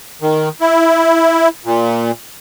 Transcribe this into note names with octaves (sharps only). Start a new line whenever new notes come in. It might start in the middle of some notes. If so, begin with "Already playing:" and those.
D#3
E4
A#2